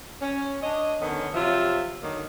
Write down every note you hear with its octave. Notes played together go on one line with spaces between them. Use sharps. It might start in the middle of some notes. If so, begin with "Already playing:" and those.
C#4
D4 C#5 D#5
D3 D#3 B3 C#4
C3 F3 F#3 F4 E5
D3 D#3 F#3 A#3